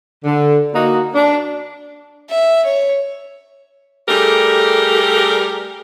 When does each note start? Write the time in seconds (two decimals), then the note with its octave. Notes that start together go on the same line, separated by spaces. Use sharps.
0.24 D3
0.74 A#3 D#4 F#4
1.14 D4
2.29 E5
2.65 C#5
4.08 G3 A3 G4 G#4 A#4